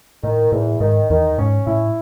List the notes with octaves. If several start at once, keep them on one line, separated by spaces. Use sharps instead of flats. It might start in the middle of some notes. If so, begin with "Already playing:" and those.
A2 D#3
E2 A2
G#2 D#3
E2 D#3
G#2 C#4
A2 E4